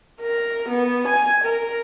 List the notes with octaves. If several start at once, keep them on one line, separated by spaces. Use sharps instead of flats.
A#4
B3
G#5
A#4